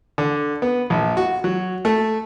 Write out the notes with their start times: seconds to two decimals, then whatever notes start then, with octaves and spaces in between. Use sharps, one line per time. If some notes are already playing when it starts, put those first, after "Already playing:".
0.18 D3
0.62 B3
0.90 A#1
1.17 F#4
1.44 F#3
1.85 A3